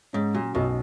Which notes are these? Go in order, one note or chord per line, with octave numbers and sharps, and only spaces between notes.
G#2 C#4
A#2 F#3
B1 B2